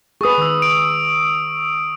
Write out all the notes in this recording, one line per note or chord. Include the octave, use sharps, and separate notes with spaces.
G#4 B4 C#6 D#6
D#3 C#6 E6
D7